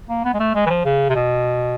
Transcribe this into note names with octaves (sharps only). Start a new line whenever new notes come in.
A#3
B3
G#3
A3
G#3
E3
F3
C#3
C3
B2